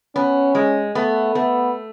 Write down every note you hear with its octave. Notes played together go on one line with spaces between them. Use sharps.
B3 C#4
G#3
A3 B3
A3 B3